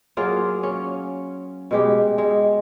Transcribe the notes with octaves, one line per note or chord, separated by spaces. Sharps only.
F#3 A#3 F4 G#4
C#4
B2 G#3 G4
G#3